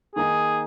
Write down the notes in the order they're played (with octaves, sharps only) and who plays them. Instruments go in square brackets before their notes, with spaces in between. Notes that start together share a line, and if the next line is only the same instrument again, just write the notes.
[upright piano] D#3 A#3 D#4 [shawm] G#4